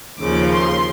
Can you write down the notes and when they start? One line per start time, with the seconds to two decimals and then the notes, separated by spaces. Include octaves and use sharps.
0.19 D#2 C#3 F3 D6
0.51 C6